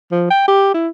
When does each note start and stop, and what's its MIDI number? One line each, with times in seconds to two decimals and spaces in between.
0.11 0.28 53
0.30 0.44 79
0.48 0.71 67
0.74 0.88 64